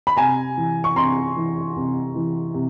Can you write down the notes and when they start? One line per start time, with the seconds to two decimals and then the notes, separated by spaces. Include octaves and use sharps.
0.07 B5
0.17 C3 G#5 A#5
0.57 E3
0.84 C#6
0.96 C3 A#5 C6
1.36 E3
1.76 C3
2.15 E3
2.54 C3